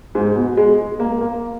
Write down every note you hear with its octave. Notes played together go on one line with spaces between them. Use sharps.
G#2
B2
G#3
A#3
A#3